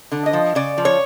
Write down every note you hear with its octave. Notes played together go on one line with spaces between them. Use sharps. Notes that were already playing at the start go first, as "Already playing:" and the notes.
D3
D#5
F3
C#3 D5
F3
C#5